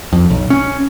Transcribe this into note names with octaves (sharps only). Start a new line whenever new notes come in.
F2
B1
C#4